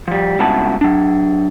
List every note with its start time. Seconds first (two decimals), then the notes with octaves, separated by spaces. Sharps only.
0.08 F3 G3
0.39 C#2 G2 B2 E4 F#4 A5
0.81 F#3 D4